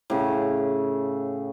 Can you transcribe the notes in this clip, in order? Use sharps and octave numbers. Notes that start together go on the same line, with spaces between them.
A2 C#3